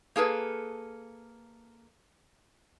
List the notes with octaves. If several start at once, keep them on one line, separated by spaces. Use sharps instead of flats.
A#3 G#4 A4 B4